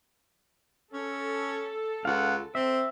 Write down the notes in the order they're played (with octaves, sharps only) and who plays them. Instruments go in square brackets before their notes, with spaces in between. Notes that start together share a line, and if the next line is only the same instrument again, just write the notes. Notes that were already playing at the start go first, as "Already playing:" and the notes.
[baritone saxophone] C#4 [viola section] A4
[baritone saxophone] C#2 [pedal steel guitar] F5 F#5
[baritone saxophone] C4 [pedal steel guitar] E5